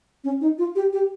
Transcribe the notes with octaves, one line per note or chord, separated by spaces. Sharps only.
C#4
D#4
F4
G4
G4